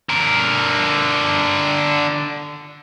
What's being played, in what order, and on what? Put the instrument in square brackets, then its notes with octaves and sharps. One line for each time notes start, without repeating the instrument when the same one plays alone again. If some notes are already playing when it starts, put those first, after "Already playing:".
[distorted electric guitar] D3 A#4